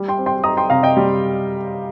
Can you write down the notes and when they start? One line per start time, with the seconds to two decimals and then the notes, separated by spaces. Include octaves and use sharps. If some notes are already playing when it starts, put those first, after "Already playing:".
Already playing: G3
0.08 G5 C6
0.18 C4
0.26 G5 C6
0.44 D#4 A#5 D#6
0.57 G5 C6
0.70 C3 F5 A#5
0.83 D#5 G5
0.97 G3